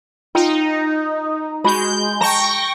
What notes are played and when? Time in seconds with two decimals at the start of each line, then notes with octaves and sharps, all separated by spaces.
0.35 D#4 F4 G5
1.64 G#3 F#4 B5 G6
2.21 G5 A5 A#5 C#6 A#6